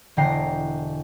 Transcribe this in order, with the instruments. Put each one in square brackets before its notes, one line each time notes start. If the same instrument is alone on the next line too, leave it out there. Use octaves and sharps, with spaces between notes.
[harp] E1 D3 G5 A#5 C7